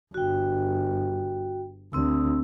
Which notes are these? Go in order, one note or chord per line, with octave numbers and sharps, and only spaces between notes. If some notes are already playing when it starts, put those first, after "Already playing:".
G1 F#4 G5
D2 C4 E6